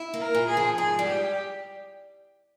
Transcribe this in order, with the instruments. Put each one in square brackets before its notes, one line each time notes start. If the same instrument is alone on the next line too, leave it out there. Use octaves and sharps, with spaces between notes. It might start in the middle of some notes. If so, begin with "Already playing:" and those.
Already playing: [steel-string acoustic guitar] E4
A#3
[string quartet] A#4
[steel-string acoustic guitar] A#2
[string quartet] G#4
[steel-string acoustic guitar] F3
[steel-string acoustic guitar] G#2 [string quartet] G#4
[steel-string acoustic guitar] G3
[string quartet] G4